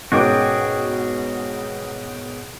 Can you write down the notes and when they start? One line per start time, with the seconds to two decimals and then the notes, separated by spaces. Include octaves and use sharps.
0.12 G#2 B2 C#4 F#4 G#4 A#4 G5 D6